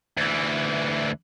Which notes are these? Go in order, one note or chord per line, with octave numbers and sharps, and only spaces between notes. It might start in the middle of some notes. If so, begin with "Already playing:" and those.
D2 E3